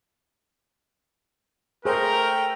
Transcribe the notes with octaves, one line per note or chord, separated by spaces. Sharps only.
A3 G#4 A#4 C5 G5